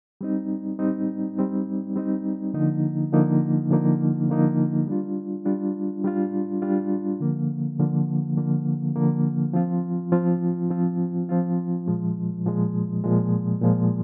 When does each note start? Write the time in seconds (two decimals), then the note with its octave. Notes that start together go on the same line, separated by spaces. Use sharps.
0.21 G3 C4 D#4
0.79 G3 C4 D#4
1.37 G3 C4 D#4
1.96 G3 C4 D#4
2.54 D3 F3 A#3 D#4
3.12 D3 F3 A#3 D#4
3.70 D3 F3 A#3 D#4
4.29 D3 F3 A#3 D#4
4.87 G3 D4 F4
5.45 G3 D4 F4
6.04 G3 D4 F4
6.62 G3 D4 F4
7.20 D3 F3 A#3
7.79 D3 F3 A#3
8.37 D3 F3 A#3
8.96 D3 F3 A#3
9.54 F3 C4 F4
10.12 F3 C4 F4
10.70 F3 C4 F4
11.29 F3 C4 F4
11.87 A#2 F3 G#3
12.45 A#2 F3 G#3
13.04 A#2 F3 G#3
13.61 A#2 F3 G#3